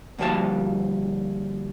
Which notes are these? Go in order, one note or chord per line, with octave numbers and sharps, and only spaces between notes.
D2 G2 A#2 F3 G3 A5